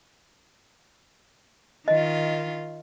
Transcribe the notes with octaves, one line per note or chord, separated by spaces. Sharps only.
D#3 F4 D#5